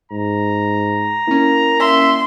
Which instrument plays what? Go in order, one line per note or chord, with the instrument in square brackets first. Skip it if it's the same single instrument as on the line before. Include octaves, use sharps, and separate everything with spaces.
[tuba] G#2 [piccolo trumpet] A#5
[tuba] A#3 [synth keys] C#4 E4
[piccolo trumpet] E5 [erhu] C6